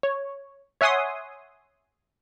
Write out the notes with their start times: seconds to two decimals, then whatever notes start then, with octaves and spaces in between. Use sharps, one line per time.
0.03 C#5
0.81 C#5 E5 F#5 G#5 C6 D#6